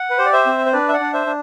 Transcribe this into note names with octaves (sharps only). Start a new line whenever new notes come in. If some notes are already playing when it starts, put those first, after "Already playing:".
Already playing: F#5
B4
G4 C5
D5
C5 E5
C4
C5
D4 B4 D5
E5
D5 F#5
D4
C5 E5
D4